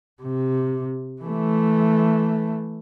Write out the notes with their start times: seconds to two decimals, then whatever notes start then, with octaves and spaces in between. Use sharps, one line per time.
0.22 C3
1.22 E3 A3